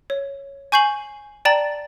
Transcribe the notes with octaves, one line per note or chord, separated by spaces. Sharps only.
C#5
G#5 C#6 G6 C7 F#7
D5 G5 A5 A#5 A6 F#7